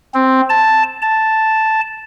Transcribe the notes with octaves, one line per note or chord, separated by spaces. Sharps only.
C4
A5
A5